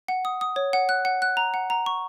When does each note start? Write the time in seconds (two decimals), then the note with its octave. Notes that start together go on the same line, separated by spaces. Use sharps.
0.08 F#5
0.25 D#6
0.41 D#6
0.56 C#5
0.73 F#5
0.89 F#6
1.05 F#5
1.22 F#6
1.37 A#5
1.54 F#5
1.70 A#5
1.86 C#6